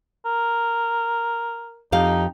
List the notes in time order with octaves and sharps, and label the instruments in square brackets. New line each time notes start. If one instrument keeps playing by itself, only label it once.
[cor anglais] A#4
[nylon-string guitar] F2 G4 F5 [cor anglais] D#4